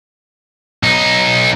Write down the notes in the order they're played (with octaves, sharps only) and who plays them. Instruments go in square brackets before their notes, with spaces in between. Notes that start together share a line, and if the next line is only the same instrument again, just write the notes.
[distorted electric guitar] B1 D#4